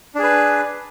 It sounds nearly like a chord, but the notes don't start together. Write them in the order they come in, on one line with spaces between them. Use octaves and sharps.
D4 G#4 B4